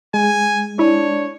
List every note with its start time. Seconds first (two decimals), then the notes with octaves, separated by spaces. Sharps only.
0.14 G#3 G#5
0.79 D4 E4 C#5